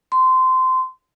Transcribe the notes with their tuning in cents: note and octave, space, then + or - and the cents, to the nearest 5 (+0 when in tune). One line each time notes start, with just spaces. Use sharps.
C6 -20